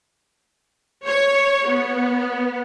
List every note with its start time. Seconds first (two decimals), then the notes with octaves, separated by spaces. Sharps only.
1.05 C#5
1.68 B3